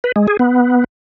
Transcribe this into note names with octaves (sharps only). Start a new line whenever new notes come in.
B4
G#3
G#4
B3